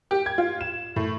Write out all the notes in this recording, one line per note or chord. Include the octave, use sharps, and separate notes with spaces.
G4
G#6
F4
E7
A2